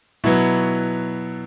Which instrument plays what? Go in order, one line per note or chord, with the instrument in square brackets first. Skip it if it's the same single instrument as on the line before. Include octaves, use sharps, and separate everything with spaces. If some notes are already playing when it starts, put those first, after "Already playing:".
[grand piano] B2 F#3 B3 E4